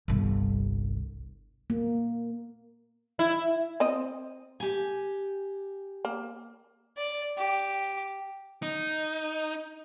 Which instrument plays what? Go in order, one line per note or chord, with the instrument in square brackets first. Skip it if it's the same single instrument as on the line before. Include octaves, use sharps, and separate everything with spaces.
[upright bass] G1 C2
[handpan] A#3
[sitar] E4
[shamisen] C4 D#5
[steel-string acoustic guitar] G4 G#5
[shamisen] A#3
[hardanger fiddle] D5
G4
[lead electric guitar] D#4